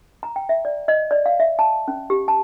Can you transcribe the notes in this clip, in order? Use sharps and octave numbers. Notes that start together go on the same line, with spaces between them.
A#5
G5
E5
D5
D#5
D5
F5
E5
A5
C#4
G4
A5